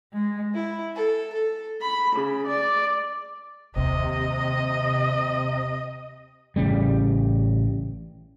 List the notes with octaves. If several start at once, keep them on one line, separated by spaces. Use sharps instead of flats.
G#3
E4
A4
A4
B5
C#3
D5
D#2 C3 A#3 D#5
A1 C#3 G3